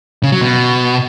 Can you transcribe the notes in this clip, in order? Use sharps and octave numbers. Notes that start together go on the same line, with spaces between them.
C#3
F#3
B2